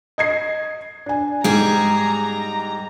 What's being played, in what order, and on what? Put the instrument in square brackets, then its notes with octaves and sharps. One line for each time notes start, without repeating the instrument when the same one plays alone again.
[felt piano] D#5 G#6 C7
D4 G#5
[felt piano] G#2 [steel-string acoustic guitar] G3 G#4 [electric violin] A#5